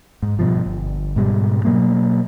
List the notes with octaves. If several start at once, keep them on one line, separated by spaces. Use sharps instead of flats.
G#2
G2 B2 F3
G1
G#2 B2 G3
B2 F#3 A#3